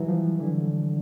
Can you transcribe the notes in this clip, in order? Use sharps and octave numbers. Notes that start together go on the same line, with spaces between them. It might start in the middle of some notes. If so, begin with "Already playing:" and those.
Already playing: E3 F#3 G3
F3
D3 E3